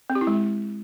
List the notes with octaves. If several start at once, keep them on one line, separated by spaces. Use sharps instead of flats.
C4
G4
E4
G#3